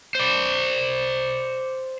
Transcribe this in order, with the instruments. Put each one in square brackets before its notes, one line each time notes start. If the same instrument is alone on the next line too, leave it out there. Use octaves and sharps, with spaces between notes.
[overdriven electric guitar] C5 D5